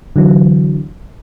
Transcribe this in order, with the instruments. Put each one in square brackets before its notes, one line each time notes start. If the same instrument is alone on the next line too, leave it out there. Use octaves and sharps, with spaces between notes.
[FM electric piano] D3 E3 F#3